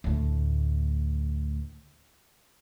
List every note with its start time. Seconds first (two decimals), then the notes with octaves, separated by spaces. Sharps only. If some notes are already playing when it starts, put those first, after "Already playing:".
0.04 D2 A2